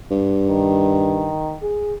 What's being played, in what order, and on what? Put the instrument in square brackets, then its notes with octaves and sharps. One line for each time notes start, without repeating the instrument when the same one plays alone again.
[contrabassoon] G2
[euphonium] D#3
G#4